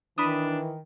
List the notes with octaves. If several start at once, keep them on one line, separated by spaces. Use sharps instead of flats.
D#3 E3 D4 B5 D#6